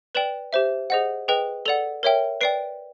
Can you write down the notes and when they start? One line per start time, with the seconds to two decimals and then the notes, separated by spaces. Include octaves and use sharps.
0.15 B4 D5 G5 E7 F#7
0.53 G4 C5 E5
0.90 G#4 C5 D#5 F#5
1.28 G#4 B4 D#5 G5
1.65 A4 D5 F#5 F7 G7
2.03 A#4 C#5 E5 G5
2.41 B4 D5 G5 C7 D7